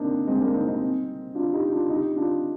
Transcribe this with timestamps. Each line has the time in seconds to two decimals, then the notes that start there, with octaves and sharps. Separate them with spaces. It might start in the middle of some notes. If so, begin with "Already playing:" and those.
Already playing: A#3 C4 D4 D#4
0.27 G#3 C4
0.41 A#3 D4
0.54 C4 D#4
0.68 C4 D#4
1.35 D4 F4
1.53 D#4 G4
1.72 D4 F4
1.89 D#4 G4
2.16 D4 F4